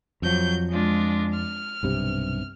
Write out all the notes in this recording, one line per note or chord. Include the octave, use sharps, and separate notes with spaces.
F2 F3 F#3 G6
G#3 D4 F4
F6
B1 G2 C3